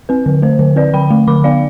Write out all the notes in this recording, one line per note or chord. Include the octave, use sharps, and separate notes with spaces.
C4 B4
D3
A3 C5
D3
C4 B4 D5
D3 G5 B5
A3
D3 B5 D6
B3 D5 F5